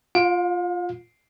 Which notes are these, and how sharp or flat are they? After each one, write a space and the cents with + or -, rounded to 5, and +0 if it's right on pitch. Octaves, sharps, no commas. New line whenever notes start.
F4 +0 F5 +40